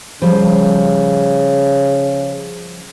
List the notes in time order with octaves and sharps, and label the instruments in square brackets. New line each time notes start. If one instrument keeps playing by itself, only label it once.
[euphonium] C#3 [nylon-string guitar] F3 G3 C5